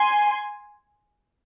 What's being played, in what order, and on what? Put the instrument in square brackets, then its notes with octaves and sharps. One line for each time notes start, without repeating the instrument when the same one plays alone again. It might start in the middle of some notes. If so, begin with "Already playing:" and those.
Already playing: [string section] G#5 C6